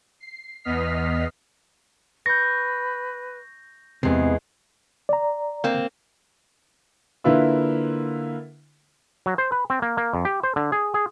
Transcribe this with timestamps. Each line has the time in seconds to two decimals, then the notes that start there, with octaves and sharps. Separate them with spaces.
0.20 C7
0.64 E2 B3 D#5 F6 B6 C7
2.26 B4 C#6 G6 A#6
4.03 E2 C3 G#3 B3 C7
5.09 D5 A#5
5.64 A#3 C4
7.24 D3 A#3 E4 F4 B4 E6
9.26 F#3
9.38 C5
9.52 B4
9.70 C4
9.82 A#3
9.97 A#3
10.13 F2
10.25 G4
10.43 C5
10.56 D3
10.72 G#4
10.94 G#4